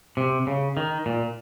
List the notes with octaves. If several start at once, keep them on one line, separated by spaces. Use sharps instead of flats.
C3
C#3
D#3
A#2